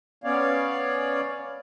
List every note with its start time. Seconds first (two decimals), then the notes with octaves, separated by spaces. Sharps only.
0.24 B3 C#4 C#5 D5 F5